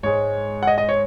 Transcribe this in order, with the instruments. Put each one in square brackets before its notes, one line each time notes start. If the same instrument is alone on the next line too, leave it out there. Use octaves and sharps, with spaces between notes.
[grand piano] G#2 G#3 C#5
F#5
D#5
D#5
C#5